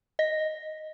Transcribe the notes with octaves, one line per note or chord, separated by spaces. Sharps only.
D#5 A#6